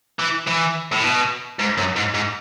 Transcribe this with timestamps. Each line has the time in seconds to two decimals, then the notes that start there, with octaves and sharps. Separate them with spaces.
0.19 E3
0.47 E3
0.92 A2
1.04 B2
1.59 G#2
1.78 F#2
1.96 G#2
2.15 G#2